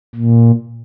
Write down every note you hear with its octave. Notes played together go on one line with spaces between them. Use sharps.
A#2